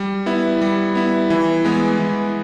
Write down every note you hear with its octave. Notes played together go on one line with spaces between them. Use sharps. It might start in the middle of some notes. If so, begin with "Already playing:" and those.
Already playing: G3
B3 E4
G3
B3 E4
E3
G#3 B3
E3